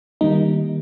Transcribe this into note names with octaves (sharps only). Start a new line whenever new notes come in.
D#3 G3 A#3 D#4